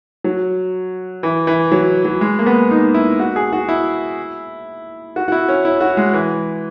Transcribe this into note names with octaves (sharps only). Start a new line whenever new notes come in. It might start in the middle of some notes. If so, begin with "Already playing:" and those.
F#3
E3
E3
F#3
F#3
G#3
A#3
B3
D#4
E4
F#4
G#4
F#4
E4
F#4
F#4
E4
C#4
E4
F#4
G#3
E3